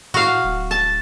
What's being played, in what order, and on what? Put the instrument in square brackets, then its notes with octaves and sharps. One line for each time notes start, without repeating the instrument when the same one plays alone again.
[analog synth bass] A2 [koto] F#4 F5
[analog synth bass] D1
[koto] A5